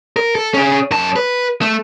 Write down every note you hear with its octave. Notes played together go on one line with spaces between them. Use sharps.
A#4
A4
C#4 G#4
F#2 A5
B4
A3